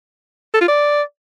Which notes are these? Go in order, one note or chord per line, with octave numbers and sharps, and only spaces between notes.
A4
F4
D5